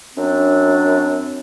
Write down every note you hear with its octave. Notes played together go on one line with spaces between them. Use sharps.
F#2 C4 D4